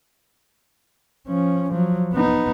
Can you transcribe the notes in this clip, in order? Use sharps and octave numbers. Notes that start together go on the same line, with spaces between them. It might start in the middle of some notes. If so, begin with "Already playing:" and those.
F3 C#4
F3 F#3
B3 D#4